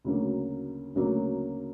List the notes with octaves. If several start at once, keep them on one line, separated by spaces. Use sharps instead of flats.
D2 C#3 F#3 A#3
D2 C#3 F#3 A#3